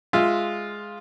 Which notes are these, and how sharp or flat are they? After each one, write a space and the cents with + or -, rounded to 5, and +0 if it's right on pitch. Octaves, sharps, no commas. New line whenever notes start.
G#3 +0 F4 +0 E5 +0